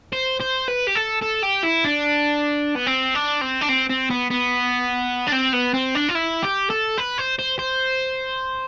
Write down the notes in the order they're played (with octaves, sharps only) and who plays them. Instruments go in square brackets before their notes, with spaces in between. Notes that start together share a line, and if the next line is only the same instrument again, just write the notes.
[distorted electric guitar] C5
C5
B4
G4
A4
A4
G4
E4
D4
B3
C4
D4
C4
D4
C4
C4
B3
B3
D4
C4
B3
C4
D4
F4
E4
G4
A4
B4
C5
C5
C5